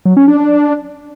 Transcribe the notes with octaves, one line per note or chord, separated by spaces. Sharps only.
F#3
C#4
D4